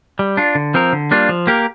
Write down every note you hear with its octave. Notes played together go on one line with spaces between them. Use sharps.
G3
D4 F4
D3
F3 C4 A#4
D3
G3 A#3 D4 F4
F3
A#3 G4 A#4